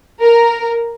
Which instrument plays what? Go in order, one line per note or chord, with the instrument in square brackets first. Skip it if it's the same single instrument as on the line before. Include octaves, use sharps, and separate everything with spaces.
[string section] A#4